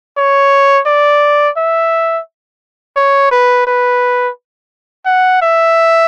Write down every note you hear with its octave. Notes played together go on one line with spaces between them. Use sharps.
C#5
D5
E5
C#5
B4
B4
F#5
E5